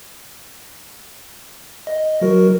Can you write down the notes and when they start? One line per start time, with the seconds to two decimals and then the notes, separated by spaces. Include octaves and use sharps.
1.87 D#5
2.22 F#3 F#4 A#4